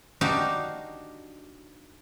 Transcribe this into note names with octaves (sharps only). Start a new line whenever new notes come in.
D4 D#4 F#4 G4 F5